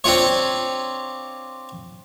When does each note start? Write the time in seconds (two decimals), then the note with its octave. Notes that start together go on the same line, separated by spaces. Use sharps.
0.04 C4 D4 F4 C#5